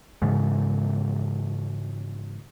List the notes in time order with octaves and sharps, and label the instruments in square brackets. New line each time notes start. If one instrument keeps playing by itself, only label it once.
[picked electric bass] G#2 C#3 E3 G#3